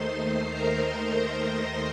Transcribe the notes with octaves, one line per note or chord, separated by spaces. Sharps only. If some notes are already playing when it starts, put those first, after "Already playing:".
Already playing: D#2 D#3 A3 D#4 C5 C6
C5 C6
A#4 A#5